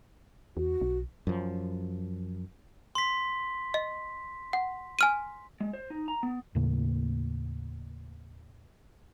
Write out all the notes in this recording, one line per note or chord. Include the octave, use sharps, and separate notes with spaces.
E2 F#4
B1
F#2 F3
C6 B6
D#5
F#5
G#5 F6 D#7
G#3
C5
D#4
A#5
B3
D#2 A2 C#3 A#3